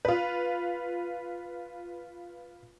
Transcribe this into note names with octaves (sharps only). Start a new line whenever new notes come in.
F4 B4